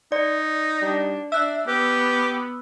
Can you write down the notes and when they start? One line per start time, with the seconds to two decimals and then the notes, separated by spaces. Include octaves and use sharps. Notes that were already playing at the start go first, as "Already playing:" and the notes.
0.12 D#4 D5
0.82 G3 D4
1.32 D4 E5 E6 F#6
1.67 B3 G4 B4